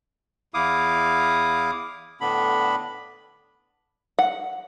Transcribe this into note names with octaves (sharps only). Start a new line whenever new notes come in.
E2 E4 F5 D6 D#6
A2 D3 B3 D4 B5
F#5